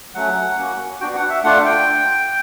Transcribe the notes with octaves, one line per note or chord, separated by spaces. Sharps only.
F#3 A3 C#4 F#5
A#3 C#4 F#4
B3 D4 F#4 G5
F#5
E5
A3 D4 F4 F#5
G5